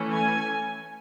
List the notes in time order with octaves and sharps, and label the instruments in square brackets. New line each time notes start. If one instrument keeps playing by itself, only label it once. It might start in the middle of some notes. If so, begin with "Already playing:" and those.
Already playing: [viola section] E3 A3 C#4
G#5